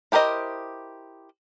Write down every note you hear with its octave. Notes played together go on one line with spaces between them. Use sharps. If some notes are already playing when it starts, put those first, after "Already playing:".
E4 G4 A#4 C5 D#5